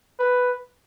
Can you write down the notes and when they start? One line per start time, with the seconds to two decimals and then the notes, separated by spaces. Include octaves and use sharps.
0.19 B4